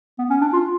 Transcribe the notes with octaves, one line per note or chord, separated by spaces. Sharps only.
B3
C#4
D4
F4